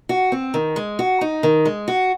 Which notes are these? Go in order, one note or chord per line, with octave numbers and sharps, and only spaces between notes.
F#4
C4
D#3
G#3
F#4
D#4
D#3
G#3
F#4